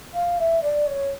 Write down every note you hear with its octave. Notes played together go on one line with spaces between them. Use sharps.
F5
E5
D5
C#5